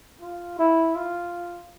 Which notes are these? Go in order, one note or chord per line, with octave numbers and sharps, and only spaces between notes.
F4
E4
F4